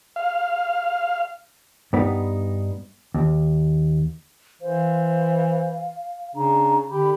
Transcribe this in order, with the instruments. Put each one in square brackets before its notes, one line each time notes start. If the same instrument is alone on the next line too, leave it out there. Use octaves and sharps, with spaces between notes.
[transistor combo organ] F5
[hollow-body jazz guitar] G2 B3 D#4
D#2
[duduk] E3 [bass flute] C5 [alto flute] F5
[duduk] C#3 [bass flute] D4 [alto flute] A#5
[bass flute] D3 [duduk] G4 [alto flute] B5